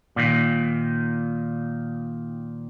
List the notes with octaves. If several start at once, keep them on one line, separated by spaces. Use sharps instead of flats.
A#2 D#3